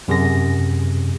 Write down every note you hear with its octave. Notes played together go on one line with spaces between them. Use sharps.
F#2 C3 G#4 A#6